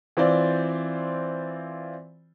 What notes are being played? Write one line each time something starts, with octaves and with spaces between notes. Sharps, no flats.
E3 C4 F4 C5 D5